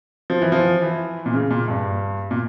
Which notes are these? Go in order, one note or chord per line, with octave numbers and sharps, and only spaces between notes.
F3
E3
F3
E3
A#2
C#3
A#2
G2
A#2